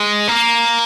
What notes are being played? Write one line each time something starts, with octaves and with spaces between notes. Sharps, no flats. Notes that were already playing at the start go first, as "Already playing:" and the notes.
Already playing: G#3
A#3